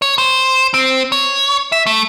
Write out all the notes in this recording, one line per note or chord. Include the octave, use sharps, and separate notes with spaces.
C#5
C5
C4
C#5
E5
A3